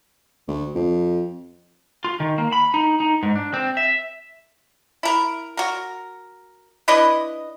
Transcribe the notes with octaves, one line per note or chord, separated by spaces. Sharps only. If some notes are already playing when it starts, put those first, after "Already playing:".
D2
F2
F4
D#3
A#3
B5
D#4
D#4
G#2
D4
C4
E5
E4 A#4
F#4 A#4
D4 E4 B4 D#5